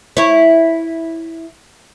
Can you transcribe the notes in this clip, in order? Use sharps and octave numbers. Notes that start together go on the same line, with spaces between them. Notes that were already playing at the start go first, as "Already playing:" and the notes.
E4 C#5